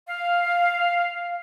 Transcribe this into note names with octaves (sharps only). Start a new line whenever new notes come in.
F5